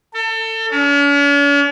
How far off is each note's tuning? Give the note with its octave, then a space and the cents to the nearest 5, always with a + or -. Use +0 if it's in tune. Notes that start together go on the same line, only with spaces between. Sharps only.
A4 +30
C#4 +45